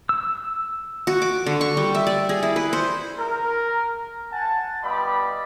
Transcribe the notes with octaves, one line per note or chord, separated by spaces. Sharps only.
E6
F#4
D6
D3
C#6
G3
E5
D5
G#4
E4
B4
C5
A#4
F#5 G#5 A5
G3 B3 F4 D5 D#5 B5